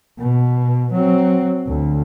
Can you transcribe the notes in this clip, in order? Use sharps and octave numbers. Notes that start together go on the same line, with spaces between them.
B2
F#3 C4
D2